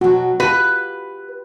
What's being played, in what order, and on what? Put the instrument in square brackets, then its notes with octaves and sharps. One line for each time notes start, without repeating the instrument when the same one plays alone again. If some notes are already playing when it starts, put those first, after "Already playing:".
[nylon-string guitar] B2 F#3 [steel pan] F#4
[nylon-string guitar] F4 G4 [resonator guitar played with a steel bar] B4